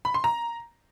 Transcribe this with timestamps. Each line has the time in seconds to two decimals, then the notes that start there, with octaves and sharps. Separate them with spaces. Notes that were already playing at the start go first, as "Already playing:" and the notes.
0.05 B5
0.14 C6
0.24 A#5